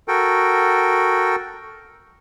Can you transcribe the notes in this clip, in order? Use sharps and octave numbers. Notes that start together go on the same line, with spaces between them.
F#4 A4 A#4 G5